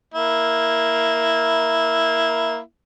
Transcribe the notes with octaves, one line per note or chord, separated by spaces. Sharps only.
A#3 E4